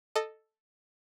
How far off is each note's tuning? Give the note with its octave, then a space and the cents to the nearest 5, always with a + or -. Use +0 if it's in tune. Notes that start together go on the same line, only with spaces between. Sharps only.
A4 +0 D#5 -15